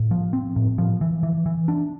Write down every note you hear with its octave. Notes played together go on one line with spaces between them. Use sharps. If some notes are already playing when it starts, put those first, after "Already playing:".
Already playing: A2
F3
C4
A2
F3
E3
E3
E3
D4